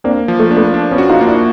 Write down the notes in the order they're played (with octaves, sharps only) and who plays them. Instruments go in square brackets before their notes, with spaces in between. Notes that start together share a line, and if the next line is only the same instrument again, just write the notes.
[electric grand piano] A#3 [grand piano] C4 D4
[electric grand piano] F3
[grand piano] A3
[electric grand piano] D4
[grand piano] A3 B3
[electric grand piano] D4
[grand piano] B3 C#4
[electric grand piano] F#4
[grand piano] D#4 F4
[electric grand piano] A#3
[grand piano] D4 E4